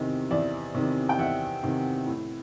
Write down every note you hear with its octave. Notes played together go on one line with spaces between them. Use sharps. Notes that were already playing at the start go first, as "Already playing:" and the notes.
Already playing: E2 C3 D#3 D#5
E2 D5 E5
C3 D#3
G5
E2 E5 F#5
C3 D#3
A2